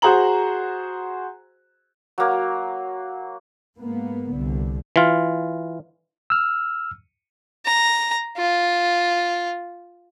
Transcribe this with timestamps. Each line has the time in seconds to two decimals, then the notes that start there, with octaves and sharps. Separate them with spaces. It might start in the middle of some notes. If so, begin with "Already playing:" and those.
0.02 F#4 G#4 C5 A#5 F#7
2.18 F#3 A#3
3.77 G#2 A#3 B3
4.33 C2 D3
4.96 E3 F4
6.30 E6 F6
7.66 A#5
8.37 F4